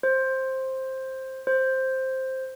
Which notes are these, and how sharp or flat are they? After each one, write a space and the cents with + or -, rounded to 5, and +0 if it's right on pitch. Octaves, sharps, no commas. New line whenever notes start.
C5 +10
C5 +5